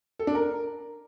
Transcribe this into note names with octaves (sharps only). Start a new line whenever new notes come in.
A4
D4
A#4